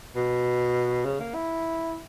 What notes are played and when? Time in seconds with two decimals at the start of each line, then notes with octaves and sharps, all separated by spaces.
0.16 B2
1.05 C#3
1.20 A#3
1.34 E4